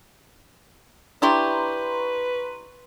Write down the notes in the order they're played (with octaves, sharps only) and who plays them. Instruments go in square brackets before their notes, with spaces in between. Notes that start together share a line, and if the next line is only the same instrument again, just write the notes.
[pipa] D4 E4 G4 [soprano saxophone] B4 [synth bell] A#5 C6 C#6